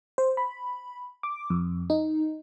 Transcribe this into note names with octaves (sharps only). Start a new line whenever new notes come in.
C5
B5
D6
F2
D#4